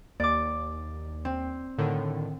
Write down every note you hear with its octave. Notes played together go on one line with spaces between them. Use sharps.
D#2 D5 D6
C4
A2 D3 D#3